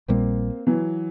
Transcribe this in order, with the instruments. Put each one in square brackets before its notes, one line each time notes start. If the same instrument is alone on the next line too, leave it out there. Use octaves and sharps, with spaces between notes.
[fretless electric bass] A#1 A#2 G3 [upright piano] A#3 C4
[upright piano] E3 F#3